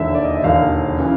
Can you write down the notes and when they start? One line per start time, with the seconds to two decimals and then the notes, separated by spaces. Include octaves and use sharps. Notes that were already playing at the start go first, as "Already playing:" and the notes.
Already playing: E1 D#2 D3 E5
0.15 D5
0.24 D#5
0.35 E5
0.43 E1 D#2 D3 F5
0.98 C#3 E3